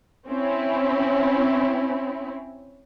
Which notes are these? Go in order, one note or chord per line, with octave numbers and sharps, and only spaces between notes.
C4 C#4 E4